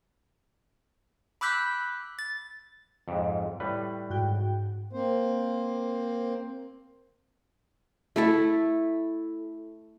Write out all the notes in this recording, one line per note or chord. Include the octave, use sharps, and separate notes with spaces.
B5 D6 E6 F#6 G6 B6
A6
F2 G#2
A2 G3 B4
G#2 F#4 G5
A#3 C4 C5
A3 E4 A4